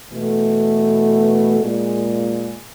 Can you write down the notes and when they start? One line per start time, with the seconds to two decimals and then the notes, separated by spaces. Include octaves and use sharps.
0.12 B2 E3 A3
1.60 A#2 G#3